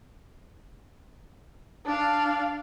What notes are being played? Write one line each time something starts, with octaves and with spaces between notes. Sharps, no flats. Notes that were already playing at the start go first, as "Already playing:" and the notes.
D4 F5